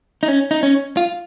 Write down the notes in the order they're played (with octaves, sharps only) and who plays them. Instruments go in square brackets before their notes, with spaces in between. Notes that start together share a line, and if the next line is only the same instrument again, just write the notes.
[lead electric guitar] D#4
C#4
D#4
C#4
F4